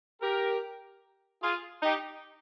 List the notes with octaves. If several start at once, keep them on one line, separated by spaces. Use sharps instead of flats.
G4 A#4
F4 G#4
D#4 G4